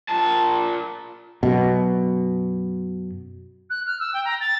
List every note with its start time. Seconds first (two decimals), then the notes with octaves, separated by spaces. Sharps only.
0.09 A#2 A5
1.43 F#2 B2
3.70 F#6
3.86 F6
3.99 E6
4.13 G5
4.25 A#5
4.40 A6